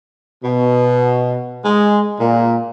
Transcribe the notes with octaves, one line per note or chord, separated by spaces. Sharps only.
B2
G#3
A#2